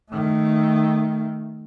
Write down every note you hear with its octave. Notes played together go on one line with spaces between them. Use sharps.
D#3 A3